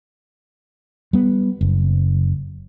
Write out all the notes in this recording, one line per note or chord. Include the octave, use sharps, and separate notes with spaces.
G3 B3
F#1